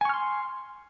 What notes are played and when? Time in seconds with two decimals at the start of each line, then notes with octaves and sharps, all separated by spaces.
0.01 G#5
0.05 C#6
0.09 F6
0.14 C6